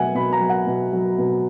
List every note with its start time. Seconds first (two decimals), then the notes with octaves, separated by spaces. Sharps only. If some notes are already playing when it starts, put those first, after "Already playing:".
Already playing: B2 F#3 E5 F#5 G#5
0.15 B2 B5
0.33 A#5
0.40 F#3
0.50 F#5
0.66 B2
0.93 F#3
1.18 B2